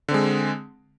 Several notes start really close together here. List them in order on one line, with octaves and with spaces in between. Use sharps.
D3 C4 G#3